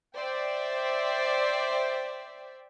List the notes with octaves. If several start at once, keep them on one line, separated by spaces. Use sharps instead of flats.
C5 D5 E5 G5